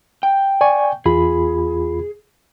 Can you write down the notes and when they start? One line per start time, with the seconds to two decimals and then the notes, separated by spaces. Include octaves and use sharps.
0.23 G5
0.61 D5 G#5 C#6
1.06 E2 F4 G#4 B5